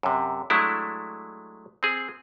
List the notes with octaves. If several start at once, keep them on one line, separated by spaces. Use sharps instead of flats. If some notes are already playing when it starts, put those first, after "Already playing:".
F#2 C3
F#3 G#3 A3 D4 E4
C4 G#4